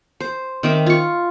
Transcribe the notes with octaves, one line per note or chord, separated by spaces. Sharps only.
C5
D#3 C4 E5 D6
F4 C#6